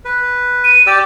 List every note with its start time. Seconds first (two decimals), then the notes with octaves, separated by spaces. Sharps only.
0.05 B4
0.64 D#7
0.87 G4 D5 D6 E6